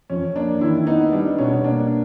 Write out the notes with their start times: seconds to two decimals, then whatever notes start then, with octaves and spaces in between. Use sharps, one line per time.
0.10 F2 C#4
0.35 A#3 D4
0.61 D#3 E4
0.87 B3 D#4
1.13 G3 D4
1.38 B2 C#4
1.64 A#3 D4